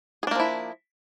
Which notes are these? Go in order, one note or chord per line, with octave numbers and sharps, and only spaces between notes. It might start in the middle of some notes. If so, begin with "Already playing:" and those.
F3 A#3 D4 E4 G#4